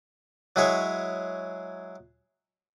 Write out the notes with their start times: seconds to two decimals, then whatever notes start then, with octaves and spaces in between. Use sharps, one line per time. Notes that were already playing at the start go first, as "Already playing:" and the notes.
0.56 F#3 G#3 E4 G#4 C#5